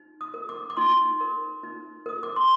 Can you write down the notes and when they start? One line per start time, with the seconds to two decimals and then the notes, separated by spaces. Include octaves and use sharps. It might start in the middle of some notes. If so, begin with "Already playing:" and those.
Already playing: D#4
0.21 D#6
0.34 A#4
0.49 D6
0.70 D6
0.77 D#4 C6
1.21 A#4
1.63 D#4
2.06 A#4 D#6
2.23 D6
2.36 C6